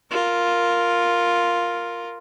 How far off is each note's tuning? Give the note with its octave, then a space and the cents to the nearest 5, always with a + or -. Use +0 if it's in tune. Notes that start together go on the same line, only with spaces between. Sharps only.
F4 +0 A#4 +0